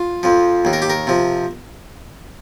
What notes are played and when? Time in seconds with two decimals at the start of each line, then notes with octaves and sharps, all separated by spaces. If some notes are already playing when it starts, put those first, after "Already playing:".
Already playing: F4
0.23 F2 F3
0.65 D#2 D#3
0.73 A#4
0.82 G4
0.90 A#4
1.07 C3 F3